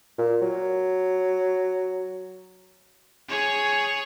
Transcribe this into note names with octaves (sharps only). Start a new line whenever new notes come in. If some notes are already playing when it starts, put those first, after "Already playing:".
A#2
F#3
G#4 C#5